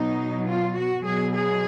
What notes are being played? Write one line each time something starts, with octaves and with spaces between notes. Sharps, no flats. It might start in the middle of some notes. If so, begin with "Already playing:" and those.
Already playing: B2 F#3 D#4
F4
F#4
B2 F#3 G#4
G#4